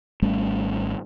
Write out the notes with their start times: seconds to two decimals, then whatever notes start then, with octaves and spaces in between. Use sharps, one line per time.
0.22 G#1 G3 A3 C#4